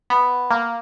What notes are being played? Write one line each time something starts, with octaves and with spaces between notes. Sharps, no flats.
B3
A#3